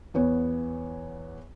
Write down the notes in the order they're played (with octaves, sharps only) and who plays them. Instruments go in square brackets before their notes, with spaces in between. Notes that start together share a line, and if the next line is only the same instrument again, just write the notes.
[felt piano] E2 B3 C#5